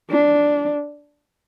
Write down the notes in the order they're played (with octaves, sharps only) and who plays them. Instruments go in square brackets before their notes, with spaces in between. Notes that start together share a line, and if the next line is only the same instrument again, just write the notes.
[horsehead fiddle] D4